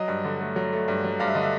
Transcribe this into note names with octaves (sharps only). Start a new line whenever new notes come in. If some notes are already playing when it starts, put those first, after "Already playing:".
Already playing: F#3 D#5
G2
D3
A3
F#3
A3
G2
F#3
G2 F5
E5
D3 D#5
E5